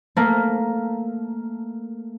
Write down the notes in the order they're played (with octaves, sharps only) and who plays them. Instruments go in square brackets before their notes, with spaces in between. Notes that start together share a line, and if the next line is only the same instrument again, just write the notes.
[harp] A3 A#3